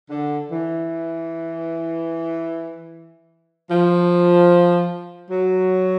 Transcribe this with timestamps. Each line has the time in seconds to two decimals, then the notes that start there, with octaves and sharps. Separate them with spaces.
0.10 D3
0.50 E3
3.70 F3
5.30 F#3